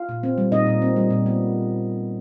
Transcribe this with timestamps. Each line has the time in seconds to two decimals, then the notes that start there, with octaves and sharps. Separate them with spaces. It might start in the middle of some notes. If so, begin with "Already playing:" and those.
Already playing: F4 F5
0.09 A#2
0.23 C4
0.38 G3
0.52 A#2 D#4 D#5
0.67 A#2
0.82 C4
0.96 G3
1.10 A#2
1.26 B3